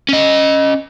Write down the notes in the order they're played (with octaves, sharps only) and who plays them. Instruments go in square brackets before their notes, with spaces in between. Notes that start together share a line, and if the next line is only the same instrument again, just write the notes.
[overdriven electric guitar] C#4 D#5